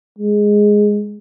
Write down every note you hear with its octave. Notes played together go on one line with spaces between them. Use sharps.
G#3